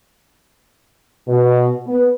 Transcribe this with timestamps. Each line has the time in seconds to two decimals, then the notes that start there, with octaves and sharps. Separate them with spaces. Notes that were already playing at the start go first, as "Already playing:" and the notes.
1.28 B2
1.87 B3